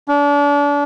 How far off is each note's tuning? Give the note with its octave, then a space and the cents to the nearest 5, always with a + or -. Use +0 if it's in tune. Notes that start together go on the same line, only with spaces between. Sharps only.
D4 -35